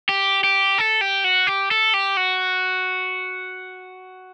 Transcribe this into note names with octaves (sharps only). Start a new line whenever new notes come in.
G4
G4
A4
G4
F#4
G4
A4
G4
F#4